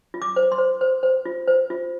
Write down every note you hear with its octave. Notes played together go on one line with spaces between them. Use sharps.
F4
D6
C5
C6
C5
C5
C5
F4
C5
F4